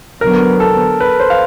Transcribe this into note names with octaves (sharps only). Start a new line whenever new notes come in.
D3 F#3 B3 A#4
A4
B4
C5
F5